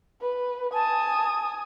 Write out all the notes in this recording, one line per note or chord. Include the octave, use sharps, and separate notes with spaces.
B4
G#5 A5 D#6